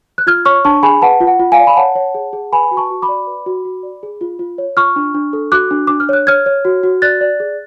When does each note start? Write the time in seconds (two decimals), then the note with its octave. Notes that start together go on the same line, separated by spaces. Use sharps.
0.18 F#6
0.27 F4 F6 G#6
0.45 C#5 C#6 F6
0.65 D4 A5 C#6
0.83 G#4 G#5 B5
1.02 B4 F#5 A5
1.21 F4
1.27 F#5
1.39 F4
1.52 F5 G#5
1.58 D5
1.67 B5
1.77 C#5 F#5 A5
1.95 C#5
2.14 G#4
2.33 G#4
2.53 B4 G#5 B5
2.71 F#4
2.77 A5 C#6
2.90 F#4
3.02 B5 D6
3.08 D5
3.27 B4
3.46 F#4
3.65 F#4
3.83 D5
4.03 G#4
4.21 F4
4.39 F4
4.58 C#5
4.77 F4 C#6 F6
4.96 D4
5.14 D4
5.33 A4
5.52 F#4 D6 F#6
5.71 D4
5.87 D4 D6
6.00 F6
6.09 C#5 F#6
6.27 C#5 F6 G#6
6.46 C#5
6.65 F#4
6.83 F#4
7.02 D5 F#6 A6
7.21 D5
7.40 G#4